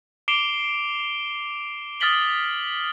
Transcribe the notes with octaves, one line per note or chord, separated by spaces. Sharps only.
D6 C7 D7 E7 F7 G7
D#6 F6 A6 B6 F#7 G7